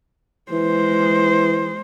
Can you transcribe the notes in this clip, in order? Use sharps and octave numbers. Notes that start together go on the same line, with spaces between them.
E3 G#3 C5